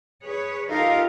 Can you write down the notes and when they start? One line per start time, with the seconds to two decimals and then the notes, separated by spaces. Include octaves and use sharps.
0.24 G#4 B4 C#5
0.70 D#4 F4 G4 A4 A#4 F5